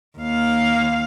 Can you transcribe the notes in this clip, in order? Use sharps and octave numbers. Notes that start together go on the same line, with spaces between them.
D#2 F5